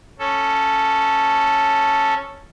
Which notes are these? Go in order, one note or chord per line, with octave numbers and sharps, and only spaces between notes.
C#4 A4